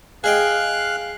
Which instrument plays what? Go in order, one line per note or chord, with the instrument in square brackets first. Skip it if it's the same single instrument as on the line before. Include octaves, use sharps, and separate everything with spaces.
[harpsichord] G#4 D#5 G5 [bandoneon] F5 F#6